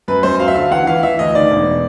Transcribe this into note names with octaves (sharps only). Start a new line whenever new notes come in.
F#2 B4
F#2 C5
F#3 F5
E5
D3 F5
E3 F#5
E3 F5
E3 E5
D2 D#5
D#3 D5
E1